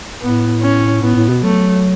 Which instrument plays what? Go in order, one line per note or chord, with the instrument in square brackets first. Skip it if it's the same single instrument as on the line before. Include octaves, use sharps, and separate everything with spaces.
[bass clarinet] A2 [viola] B3
[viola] C#4
[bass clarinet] A2 [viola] B3
[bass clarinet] A2
B2
[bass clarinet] F#3 [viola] A3